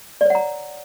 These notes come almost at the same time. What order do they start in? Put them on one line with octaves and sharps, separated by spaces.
D5 C#5 F#5 A#5